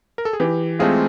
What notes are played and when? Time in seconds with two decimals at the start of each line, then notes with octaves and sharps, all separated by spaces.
0.18 A#4
0.25 A4
0.33 G#4
0.40 E3 G4
0.79 G#3 A3 C4 F4 G#4